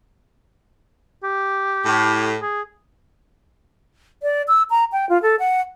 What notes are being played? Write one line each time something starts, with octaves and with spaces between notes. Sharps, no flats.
G4
A2
G#4
D5
E6
A#5
G5
F4
A4
F#5